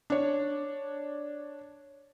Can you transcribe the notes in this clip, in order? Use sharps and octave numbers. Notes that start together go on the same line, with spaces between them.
D4 C#5